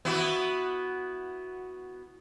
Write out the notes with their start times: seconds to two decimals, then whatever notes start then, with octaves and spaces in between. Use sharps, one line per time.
0.05 B3 E4 F#4